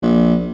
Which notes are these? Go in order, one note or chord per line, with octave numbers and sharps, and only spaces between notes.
A#1